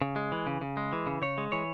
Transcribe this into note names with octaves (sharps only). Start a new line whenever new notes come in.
C#3
G#3
E3
C#3
C#3
G#3
E3
C#3
C#3 C#5
G#3
E3 C#5